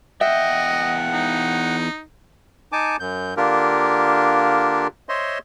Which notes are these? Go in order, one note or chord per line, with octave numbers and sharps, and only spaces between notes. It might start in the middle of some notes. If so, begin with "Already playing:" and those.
E2 D#5 E5 F#5 G5
D#4
D#4 G#5 A5 D6
F#2 G6
D3 A#3 D4 F4 G4 A#4
C5 C#5 D#5 E5 C6